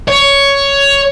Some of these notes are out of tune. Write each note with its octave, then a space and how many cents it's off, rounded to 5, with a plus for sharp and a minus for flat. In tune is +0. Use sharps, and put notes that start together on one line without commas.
C#5 +10